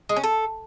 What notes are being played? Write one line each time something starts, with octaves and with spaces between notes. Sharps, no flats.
G#3
C#4
A4